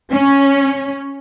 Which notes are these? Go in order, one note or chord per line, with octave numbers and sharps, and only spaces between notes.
C#4